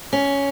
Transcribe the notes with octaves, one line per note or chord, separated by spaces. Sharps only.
C#4